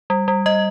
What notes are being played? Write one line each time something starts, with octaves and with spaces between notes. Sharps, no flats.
G3
G3
G3 D#5